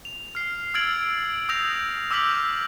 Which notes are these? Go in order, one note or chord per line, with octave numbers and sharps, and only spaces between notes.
F7
F6 C7
E6 F6 G#6 A6 D7 F#7
D#6 E6 G6 A#6 F7
D6 E6 F6 G6 B6 F#7